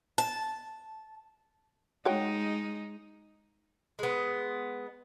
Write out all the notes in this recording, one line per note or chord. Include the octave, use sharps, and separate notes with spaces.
A5
G#3 D#4 F#4 C#5 G5
G#3 B3